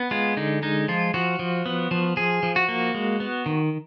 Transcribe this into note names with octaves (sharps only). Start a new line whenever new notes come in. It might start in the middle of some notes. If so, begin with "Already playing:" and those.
Already playing: B3
G#3 F4
D3 D#4
G#3 D#4
F3 F4
F3 F#4
F3
B3
F3
F3 G#4
F3
F#4
A#3
G#3
B3
D#3